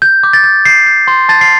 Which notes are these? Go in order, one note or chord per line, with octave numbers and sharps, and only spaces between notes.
G6
D6
A6
G6
G6 C7
G6
C6
A5 A6
C7